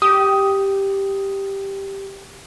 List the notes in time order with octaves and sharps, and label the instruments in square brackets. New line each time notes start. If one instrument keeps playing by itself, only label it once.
[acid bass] G4 [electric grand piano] D#6